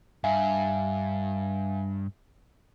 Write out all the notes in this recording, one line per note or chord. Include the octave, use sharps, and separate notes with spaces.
G2 E5 F5 G#5